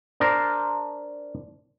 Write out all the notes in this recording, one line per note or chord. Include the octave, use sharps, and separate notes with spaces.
D4 A#4 C5